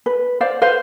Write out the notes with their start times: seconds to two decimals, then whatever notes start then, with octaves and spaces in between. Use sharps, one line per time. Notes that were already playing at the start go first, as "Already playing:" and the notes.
0.06 B4
0.41 C5 D5 F5
0.62 B4 C5 F5